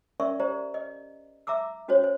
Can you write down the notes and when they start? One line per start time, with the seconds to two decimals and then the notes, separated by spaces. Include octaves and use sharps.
0.20 C#4 A#4 D5 E5 C6 C#6
0.40 G4 C5 D5 A#5
0.74 D#5
1.47 E5 A#5 D6 E6
1.88 C#4 F#4 C5 C#5
2.04 C5